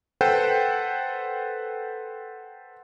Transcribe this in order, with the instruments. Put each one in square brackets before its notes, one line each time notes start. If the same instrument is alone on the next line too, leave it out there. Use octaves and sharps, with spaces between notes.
[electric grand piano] A4 B4 C5 F#5 G5